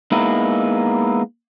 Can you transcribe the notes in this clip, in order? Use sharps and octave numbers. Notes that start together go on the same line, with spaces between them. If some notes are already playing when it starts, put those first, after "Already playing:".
G#3 A#3 B3 D#4 E4